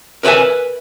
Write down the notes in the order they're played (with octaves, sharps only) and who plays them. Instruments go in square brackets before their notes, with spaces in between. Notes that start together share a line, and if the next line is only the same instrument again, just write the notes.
[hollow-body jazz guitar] A#4 B4 C#5 E5 G#5